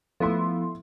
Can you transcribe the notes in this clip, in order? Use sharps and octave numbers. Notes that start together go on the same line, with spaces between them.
F3 A3 B3 E4 C6